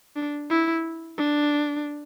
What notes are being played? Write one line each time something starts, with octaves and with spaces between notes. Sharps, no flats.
D4
E4
D4